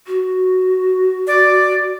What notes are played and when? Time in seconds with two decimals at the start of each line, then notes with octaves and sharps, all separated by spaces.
0.07 F#4
1.27 D5